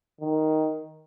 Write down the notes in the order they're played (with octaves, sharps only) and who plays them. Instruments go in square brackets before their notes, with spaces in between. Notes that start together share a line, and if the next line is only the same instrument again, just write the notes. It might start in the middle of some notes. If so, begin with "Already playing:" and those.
[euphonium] D#3